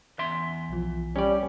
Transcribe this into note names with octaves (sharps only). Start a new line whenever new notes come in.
E2 E5 C6
B1 F3
G3 C#4 D5